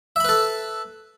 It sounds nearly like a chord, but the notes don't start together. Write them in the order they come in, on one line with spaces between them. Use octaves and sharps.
E5 B5 B4 A4